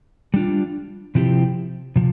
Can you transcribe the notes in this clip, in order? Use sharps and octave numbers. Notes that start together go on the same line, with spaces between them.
G3 D4 F4
C3 F3 C4 E4 G4
C3 F3